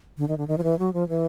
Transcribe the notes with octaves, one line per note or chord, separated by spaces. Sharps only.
D3
D#3
D3
D#3
F3
E3
F#3
F3
E3